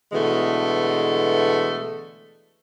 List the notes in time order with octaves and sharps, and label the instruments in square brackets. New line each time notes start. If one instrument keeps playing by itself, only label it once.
[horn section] B2 D3 E3 G#3 A3